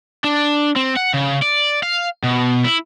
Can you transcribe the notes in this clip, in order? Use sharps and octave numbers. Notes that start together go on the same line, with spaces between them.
D4
C4
F#5
C#3
D5
F5
B2
E4